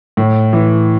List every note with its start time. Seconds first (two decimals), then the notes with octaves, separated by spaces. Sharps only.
0.17 A2
0.53 E3